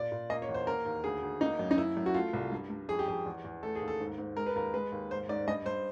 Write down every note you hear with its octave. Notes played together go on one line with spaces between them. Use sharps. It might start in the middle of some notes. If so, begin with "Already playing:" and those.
Already playing: A#2 D5
A#2
A#3 D#5
C#5
E2
C5
A#3 A#4
D#2
D2 G#4
D2
A#3 D#4
F#2
D#4
F#2 E4
F#2
F#4
A3 F4
C2
G2
G2
F2 G#4
G4
F2 G#4
E2
E2
A3 A4
G#4
D#2
A4
G#2
G#2
G#3 A#4
B4
D#2 A#4
G#3 B4
D#2
G#2 C5
G#2 D5
G2 D#5
G2 C5